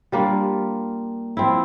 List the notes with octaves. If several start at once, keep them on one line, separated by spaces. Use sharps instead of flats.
G3 A#3 D4 F4
F3 C4 E4